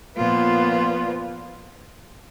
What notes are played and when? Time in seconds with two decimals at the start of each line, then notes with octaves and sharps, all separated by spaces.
0.16 A#2 F3 B3 F4